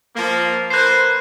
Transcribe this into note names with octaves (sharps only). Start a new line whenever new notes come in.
F3 A#3
A#3 B4 C5 F#6 C7